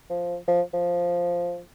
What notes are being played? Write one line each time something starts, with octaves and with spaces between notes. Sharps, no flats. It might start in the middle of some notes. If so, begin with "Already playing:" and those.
F3
F3
F3